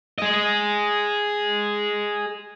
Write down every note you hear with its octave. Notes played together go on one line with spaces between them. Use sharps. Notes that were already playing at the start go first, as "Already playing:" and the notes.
G#4 D#5